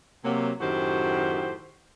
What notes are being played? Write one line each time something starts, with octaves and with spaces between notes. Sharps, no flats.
C3 F#3 A#3
F#2 A2 D#3 F#4 G4 C5